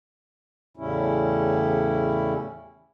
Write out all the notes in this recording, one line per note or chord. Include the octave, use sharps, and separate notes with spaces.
E2 A2 C#3 G3 C#4 E4